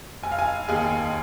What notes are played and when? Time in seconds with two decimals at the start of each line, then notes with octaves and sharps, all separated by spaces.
0.23 F1 G#5
0.31 F5
0.39 G#5
0.69 D#2 D#3 G#4